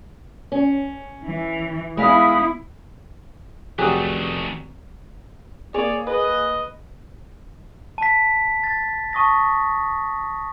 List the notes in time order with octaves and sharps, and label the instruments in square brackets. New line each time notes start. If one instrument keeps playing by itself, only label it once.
[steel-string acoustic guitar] C#4
[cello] E3
[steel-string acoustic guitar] G#3 F5 [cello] B3 E4 [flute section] B5 D#6
[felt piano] F1 [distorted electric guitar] D#3 A3 [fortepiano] F#3 G4 [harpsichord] G#4
[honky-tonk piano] A#3 G#4 [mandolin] C#5 [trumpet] D5
[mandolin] B4 [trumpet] D#5
[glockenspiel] A5 B6
A6
A5 C#6 D#6 A#6